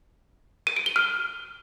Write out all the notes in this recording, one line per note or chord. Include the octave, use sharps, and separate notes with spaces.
D#7
D7
G7
F6